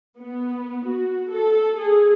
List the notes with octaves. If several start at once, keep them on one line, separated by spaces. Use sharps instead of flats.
B3
F#4
A4
G#4